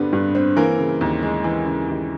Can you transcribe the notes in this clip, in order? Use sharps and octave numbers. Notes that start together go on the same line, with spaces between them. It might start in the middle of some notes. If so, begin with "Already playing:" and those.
Already playing: G2 D3 G3 B3 C4 B4
G2
C4
E3 A#3 A#4
C#3
D#2
G#3
E3
C#3
D#2